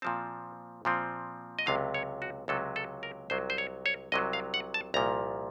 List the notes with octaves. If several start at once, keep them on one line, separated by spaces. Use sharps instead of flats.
A#2 F3 C4 A5
A#2 F3 C4
D#5
C#2 C3 F#3 F5
C#5
F#4
C#2 C3 F#3 A4
A4
A#4
C2 C3 F#3 C5
C5
C#5
C#5
C2 C3 F#3 D#5
F5
F#5
A5
C2 A#2 F3 A#5